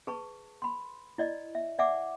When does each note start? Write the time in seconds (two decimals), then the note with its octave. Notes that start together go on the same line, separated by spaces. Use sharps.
0.07 G#4 B4 A5 C#6
0.62 B5 C6
1.18 E4 D5 D#5
1.55 E5
1.79 D5 E5 F#5 G#5 D6